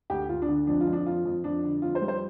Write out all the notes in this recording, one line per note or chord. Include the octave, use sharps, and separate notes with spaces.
D2 G4
D2 F4
D4
D3
F2 D4
F4
F2
D4
F2 F4
F2
F2 D4
D3
F2 F4
C5
G3
C5